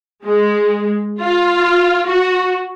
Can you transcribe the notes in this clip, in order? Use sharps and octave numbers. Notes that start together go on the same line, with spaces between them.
G#3
F4
F#4